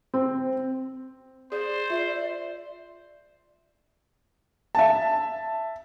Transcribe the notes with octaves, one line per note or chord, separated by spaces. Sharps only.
C4
G#4 C5 D5
F4 E5
E5 A5